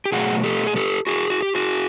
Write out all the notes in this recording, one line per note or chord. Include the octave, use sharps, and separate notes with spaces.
G4
B2 F#3 A3 F#4 G#4
G4 A4
G#4
G4 A4
F#4 G#4
F#4
G4
F#4 G#4